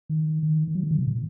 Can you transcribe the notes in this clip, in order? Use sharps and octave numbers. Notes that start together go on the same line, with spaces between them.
D#3
D#3
D#3
F#3
D#3
D3
C3
A#2